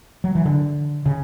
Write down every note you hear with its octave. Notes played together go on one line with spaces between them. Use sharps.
F#3
E3
D3
C#3